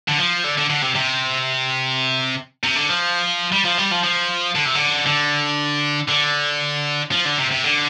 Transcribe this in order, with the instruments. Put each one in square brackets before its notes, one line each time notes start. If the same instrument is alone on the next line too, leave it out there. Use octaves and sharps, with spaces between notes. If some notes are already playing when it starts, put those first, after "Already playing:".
[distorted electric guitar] D3
F3
D3
D3
D3
C3
C3
C3
D3
F3
G3
F3
G3
F3
F3
D3
C3
D3
D3
D3
F3
D3
C3
C3
D3